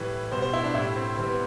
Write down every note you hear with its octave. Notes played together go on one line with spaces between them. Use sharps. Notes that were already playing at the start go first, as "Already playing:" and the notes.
Already playing: A2 E3 G3 B4
B2 G3 C5
C5
E4
D4
A2 G3 E4
C4
C3 E3 G3 C4
B3